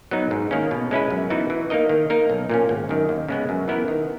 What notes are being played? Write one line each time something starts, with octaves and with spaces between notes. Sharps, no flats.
F#3 B3 D#4
G#2
D#3 A#3 C#4
B2
G#3 C#4 E4 B4
F#2
E3 B3 D#4 F#4
E3
A#3 D#4 A#4 D#5
D#3
A#3 D#4 A#4
B1
A#2 A#3 C#4
G#1
F#2 D#3
D#2
C#3 G#3 B3
F#2
E3 B3 E4 A#4
D#3